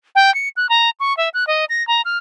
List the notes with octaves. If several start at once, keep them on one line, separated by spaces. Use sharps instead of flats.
G5
C#7
F#6
A#5
C#6
E5
F#6
D#5
A#6
A#5
F6